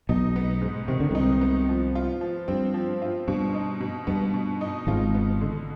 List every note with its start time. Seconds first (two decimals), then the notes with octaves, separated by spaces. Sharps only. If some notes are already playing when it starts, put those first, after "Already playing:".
0.09 B1 B2 D#4
0.36 B3
0.61 G#2
0.88 C3 D#3
1.00 D3
1.11 C2 C3 D#4
1.41 B3
1.69 F3
1.95 F4
2.21 F3
2.48 G2 C4
2.74 F3
3.02 F4
3.28 G2 B2
3.54 D#4
3.80 B2
4.07 G2 B3
4.34 B2
4.61 D#4
4.87 G#1 G#2 F4
5.14 B3
5.41 D3